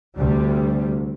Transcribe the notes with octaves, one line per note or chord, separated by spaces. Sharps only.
D2 C3 G3